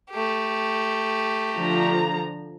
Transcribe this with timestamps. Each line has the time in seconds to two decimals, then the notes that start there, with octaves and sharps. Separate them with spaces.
0.11 A3 G4
1.54 D3 F3 A#5